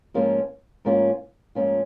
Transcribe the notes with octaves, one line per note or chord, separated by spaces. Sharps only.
G#2 F3 A#3 C#4 F4
G#2 F3 A#3 C#4 F4
G#2 F3 A#3 C#4 F4